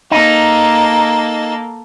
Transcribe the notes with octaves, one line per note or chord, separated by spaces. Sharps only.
A#3 D#4 A4